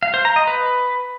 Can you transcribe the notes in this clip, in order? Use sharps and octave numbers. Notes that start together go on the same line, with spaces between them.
F5
C5
A#5
D#5
B4